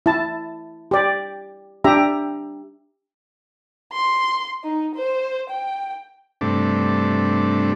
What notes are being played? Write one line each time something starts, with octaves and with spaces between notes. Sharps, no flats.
E4 A5
G4 D5
D4 G4 E5 A#5
C6
D#4
C5
G5
G2 C3 A3 D4